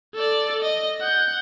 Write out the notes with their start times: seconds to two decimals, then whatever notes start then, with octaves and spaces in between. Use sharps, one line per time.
0.15 A4 D5
0.63 D#5
1.01 F#5 G6